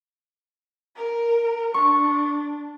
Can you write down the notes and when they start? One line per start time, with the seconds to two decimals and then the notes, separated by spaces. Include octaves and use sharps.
0.96 A#4
1.74 D4 C#6